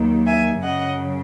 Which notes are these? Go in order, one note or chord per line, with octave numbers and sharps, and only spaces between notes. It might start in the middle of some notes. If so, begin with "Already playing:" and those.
Already playing: D#2 D#3 F#3
E5 G#5
F#2 C#3 F#3 D#5 F#5